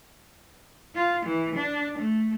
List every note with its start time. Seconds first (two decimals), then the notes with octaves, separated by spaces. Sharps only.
0.95 F4
1.26 E3
1.56 D4
1.99 A3